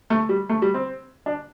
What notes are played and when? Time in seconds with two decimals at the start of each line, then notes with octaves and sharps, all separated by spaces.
0.10 A3
0.29 G3
0.49 A3
0.62 G3
0.74 C4
1.26 D4